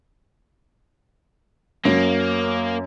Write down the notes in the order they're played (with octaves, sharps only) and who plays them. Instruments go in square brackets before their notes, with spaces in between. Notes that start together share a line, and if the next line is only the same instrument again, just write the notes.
[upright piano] F#2 C#4 [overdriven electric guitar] A#3